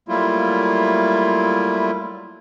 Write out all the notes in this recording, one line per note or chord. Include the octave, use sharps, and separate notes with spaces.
F#3 G3 A3 A#3 E4 F4